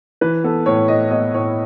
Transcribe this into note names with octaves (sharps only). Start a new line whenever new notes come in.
E3 B4
B3 A4
A2 C#5
A2 D#5
B3 D#5
A2 C#5